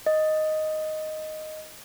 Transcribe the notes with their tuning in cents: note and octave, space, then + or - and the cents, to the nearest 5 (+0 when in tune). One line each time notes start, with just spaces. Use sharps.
D#5 +0